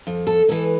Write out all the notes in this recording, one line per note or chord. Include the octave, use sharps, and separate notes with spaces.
F2
A4
E3 G#3 A4